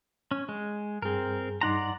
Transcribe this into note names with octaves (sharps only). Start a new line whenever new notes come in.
C#4
G#3
G2 C4 G#4 A#4
G2 D#4 D5 F#5 A#5 C6